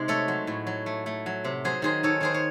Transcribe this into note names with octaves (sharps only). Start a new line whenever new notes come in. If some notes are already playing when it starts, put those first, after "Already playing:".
Already playing: C3 G#3 D#4
A3 A4 C#5
F#3
A2
F#3
A3
A3
F#3
C3
F#3 G#4 C5
D#3 G#4 C5
D#3 A4 C#5
D#3 G#4 C5
C#5